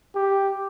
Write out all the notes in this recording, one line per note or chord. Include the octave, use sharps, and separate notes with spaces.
G4